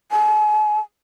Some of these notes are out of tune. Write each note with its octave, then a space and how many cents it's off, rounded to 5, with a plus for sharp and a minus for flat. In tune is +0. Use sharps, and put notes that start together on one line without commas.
G#5 +45